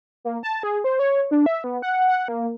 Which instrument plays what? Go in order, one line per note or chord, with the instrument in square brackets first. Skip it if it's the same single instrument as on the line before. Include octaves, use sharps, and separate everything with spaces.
[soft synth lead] A#3
A5
G#4
C5
C#5
D4
E5
B3
F#5
F#5
A#3